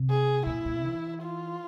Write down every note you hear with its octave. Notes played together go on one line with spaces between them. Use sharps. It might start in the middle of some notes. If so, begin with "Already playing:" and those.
Already playing: C3
G#4
A#2 E4
A#2
E3
F4